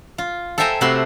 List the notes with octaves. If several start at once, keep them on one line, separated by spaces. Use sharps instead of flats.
F4
A4 C5 E5 G5 G#5 A#5
C3 A3 F#4 B5 C6